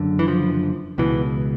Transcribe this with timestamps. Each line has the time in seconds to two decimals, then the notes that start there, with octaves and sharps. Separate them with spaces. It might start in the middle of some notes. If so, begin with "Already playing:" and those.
Already playing: F#1 F#2 D3
0.19 E3
0.28 F3
0.98 C#2 B2 E3